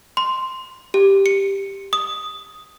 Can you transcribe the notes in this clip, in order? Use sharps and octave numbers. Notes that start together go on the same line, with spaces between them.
C6
G4
C#7
D#6